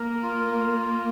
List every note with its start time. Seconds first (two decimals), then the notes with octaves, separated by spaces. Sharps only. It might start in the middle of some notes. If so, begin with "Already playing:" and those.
Already playing: A#3 A#4
0.23 F4